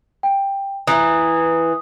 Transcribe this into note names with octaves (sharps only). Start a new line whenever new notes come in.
G5
E3 A#5 D#6